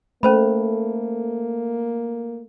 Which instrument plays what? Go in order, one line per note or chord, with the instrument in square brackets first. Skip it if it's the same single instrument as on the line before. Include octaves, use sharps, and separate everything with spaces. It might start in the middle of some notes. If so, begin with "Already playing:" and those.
[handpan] A3 [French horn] A#3 [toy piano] C#4 C5 B5